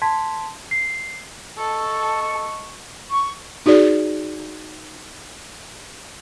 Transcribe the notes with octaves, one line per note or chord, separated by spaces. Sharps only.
A5 C6 G#6 B6
C7
A4 D#5 A5 C#6
C#6
D#4 F#4 G#4 D5